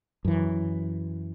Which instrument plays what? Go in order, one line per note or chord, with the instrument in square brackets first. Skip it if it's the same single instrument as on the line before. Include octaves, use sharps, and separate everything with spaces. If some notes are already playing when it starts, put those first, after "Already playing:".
[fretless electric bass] F#2 E3